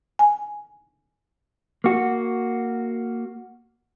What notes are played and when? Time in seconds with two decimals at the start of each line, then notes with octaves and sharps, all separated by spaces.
0.19 G#5
1.84 A#3 F#4